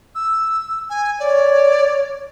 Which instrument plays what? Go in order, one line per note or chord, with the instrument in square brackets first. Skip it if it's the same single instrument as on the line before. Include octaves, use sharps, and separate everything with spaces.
[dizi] E6
G#5
[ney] C#5 [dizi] D5